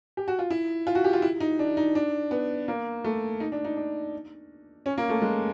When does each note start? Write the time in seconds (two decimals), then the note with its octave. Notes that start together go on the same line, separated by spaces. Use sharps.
0.17 G4
0.28 F#4
0.39 F4
0.50 E4
0.87 F4
0.95 F#4
1.04 G4
1.13 F4
1.22 E4
1.40 D#4
1.59 D4
1.77 D#4
1.95 D4
2.31 B3
2.68 A#3
3.04 A3
3.40 D#4
3.52 D4
3.65 D#4
3.77 D4
4.86 C#4
4.98 A#3
5.10 A3
5.22 G#3